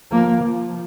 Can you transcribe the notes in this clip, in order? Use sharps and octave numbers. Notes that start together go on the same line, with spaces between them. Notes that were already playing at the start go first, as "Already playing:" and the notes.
F3 A#3
F3